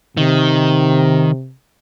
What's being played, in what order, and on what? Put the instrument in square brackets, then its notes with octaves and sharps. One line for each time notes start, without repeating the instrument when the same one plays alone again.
[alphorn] C3 [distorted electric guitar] D#3